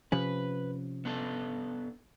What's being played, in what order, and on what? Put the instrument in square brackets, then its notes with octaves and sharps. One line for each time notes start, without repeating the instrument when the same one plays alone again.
[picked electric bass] C3 F3 C#4 [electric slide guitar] B4
[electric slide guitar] B3 D4 A4